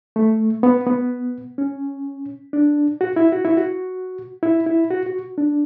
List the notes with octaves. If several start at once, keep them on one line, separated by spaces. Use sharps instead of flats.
A3
B3
B3
C#4
D4
F#4
E4
F#4
E4
F#4
E4
E4
F#4
F#4
D4